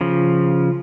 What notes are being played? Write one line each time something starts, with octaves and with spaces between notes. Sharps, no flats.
C#3 F3